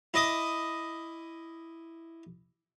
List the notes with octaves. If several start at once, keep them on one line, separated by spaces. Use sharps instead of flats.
E4 D#5 D6 D#6